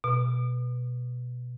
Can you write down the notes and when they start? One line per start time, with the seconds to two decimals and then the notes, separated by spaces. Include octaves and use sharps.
0.04 B2